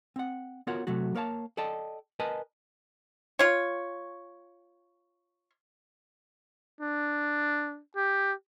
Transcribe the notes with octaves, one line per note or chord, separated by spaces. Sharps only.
C4 F#5
B3 F4 F#4 A#4 C#5 F#5
C3 F#3 A3 F#4
A#3 A#4 C#5 F5 A5
A4 D5 D#5 G5 A5
A#4 B4 D#5 G#5 A5
F4 C#5
D4
G4